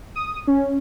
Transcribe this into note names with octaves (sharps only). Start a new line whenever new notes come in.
D#6
C#4